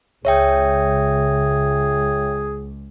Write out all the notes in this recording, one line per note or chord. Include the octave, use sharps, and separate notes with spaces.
C#2 G#4 C#5 E5 G5